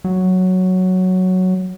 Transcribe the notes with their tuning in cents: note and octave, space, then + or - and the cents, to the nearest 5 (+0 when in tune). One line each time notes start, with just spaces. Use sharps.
F#3 +0